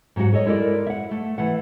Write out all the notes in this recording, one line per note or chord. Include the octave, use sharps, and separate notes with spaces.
G#2 F#3 G3 F#4 F#5
G#4 A4 C#5 D#5
G#3 E4 A4 A#4 D5
E5 F#5
A3
E3 A3 F#5